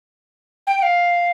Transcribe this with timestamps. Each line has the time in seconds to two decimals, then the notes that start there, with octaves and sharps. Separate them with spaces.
0.67 G5
0.78 G5
0.82 F5